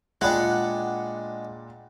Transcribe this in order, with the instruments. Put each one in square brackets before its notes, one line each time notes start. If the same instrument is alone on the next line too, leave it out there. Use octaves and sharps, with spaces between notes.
[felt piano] A#2 [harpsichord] G#3 D4 [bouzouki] F#5 [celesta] G5 B5 F#6